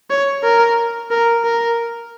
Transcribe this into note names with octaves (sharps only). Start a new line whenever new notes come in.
C#5
A#4
A#4
A#4